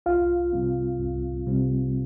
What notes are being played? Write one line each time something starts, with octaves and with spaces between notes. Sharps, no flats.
C2 F4 F5
C3 G3 C4
C2
C3 G3 C4